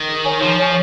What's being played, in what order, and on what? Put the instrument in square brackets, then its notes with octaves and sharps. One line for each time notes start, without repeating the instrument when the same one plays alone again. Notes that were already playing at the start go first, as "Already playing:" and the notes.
Already playing: [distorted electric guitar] D#3
[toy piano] G#4
C#5 G#5 C#6
[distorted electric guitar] F3 [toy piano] G#4
[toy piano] C#5 G#5 C#6